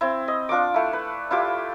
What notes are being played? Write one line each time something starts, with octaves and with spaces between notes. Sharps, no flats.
C4 E4
D#5
D4 F4 C#6 D6
A3 E4
B4
E4 F4 G4 D6